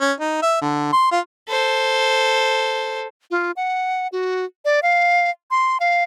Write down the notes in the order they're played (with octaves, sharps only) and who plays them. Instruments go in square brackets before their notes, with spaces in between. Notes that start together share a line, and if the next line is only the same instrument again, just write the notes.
[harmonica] C#4
D#4
E5
D3
C6
F4
[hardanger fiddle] A4 C5
[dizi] F4
F#5
F#4
D5
F5
C6
F5